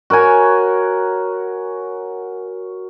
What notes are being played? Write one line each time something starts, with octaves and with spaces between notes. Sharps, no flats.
F#4 A#4 C#5 G#5